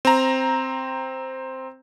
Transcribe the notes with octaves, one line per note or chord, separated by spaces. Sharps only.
C4 A#5